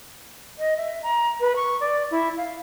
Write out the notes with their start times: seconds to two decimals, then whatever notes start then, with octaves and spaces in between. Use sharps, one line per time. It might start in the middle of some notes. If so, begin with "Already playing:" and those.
0.58 D#5
0.77 E5
1.03 A#5
1.40 B4
1.56 C#6
1.81 D5
2.11 E4
2.37 F5